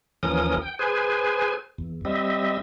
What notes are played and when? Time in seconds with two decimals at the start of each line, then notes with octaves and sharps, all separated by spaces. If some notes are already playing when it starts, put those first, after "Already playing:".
0.23 D#2 E3 F3 C#4 A#4 D#6
0.61 G5
0.79 G#4 B4 C5 G#5
1.78 E2
2.05 G3 C4 D#5 E5